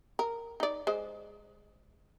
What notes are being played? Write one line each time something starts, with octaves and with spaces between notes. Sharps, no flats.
A#4
D#4 D5
G#3 C5